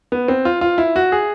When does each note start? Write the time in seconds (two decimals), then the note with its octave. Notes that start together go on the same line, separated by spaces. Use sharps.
0.12 B3
0.28 C4
0.45 F4
0.61 F4
0.78 E4
0.96 F#4
1.12 G#4